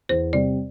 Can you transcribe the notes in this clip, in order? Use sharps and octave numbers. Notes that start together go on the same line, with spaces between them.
E2 C5
C3 G3 C4 D5